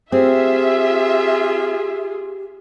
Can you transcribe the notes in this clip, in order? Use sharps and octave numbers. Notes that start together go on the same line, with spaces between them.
C4 F4 G4 G#4 E5